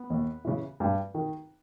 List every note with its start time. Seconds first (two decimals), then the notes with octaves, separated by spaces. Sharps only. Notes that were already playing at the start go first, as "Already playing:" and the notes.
Already playing: B3
0.10 D#2
0.45 C#3 E3
0.80 G2
1.15 D#3